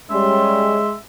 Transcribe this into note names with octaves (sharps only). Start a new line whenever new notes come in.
G3 G#3 C#4 E5 C6